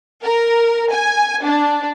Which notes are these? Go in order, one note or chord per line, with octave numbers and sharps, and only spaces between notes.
A#4
G#5
D4